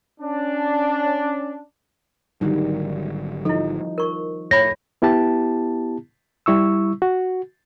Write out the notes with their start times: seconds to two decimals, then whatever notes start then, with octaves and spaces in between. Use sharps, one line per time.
0.21 C#4 D4
2.41 G#1 D3 D#3 F#3 G3
3.45 F3 D#4 E4 A4
3.98 A#4 C#6
4.51 A2 C#5 G#5 B5 A#6
5.02 B3 E4 G4 A5
6.46 G3 E4 C#6 E6
7.02 F#4